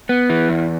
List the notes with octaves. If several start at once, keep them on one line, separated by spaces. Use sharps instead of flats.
B3
E3
E2